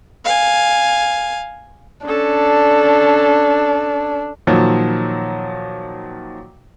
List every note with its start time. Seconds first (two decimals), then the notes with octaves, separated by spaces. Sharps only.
0.25 F5 G#5
2.06 C#4 D4 A4
4.47 A#2 D#3 F3 F#3